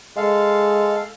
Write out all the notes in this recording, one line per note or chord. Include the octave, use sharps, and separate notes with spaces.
G#3 A4 F5